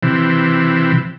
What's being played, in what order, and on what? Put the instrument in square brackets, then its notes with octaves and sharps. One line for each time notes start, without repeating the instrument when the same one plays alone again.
[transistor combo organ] C3 E3